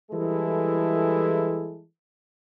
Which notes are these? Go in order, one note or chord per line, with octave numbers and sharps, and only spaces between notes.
E3 G3 G#3 E4 G#4 A4